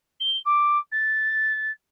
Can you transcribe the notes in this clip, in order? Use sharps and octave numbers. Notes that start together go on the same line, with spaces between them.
G7
D6
A6